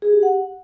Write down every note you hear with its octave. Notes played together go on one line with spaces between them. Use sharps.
G#4
G4
F#5